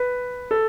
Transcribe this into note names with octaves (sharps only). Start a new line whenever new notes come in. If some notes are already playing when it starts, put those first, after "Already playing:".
Already playing: B4
A4